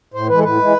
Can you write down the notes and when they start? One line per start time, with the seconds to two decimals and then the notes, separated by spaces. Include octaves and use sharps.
0.14 A2 C5
0.29 E3 G#3 B4
0.39 A4
0.43 A2 B4
0.59 E3 G#3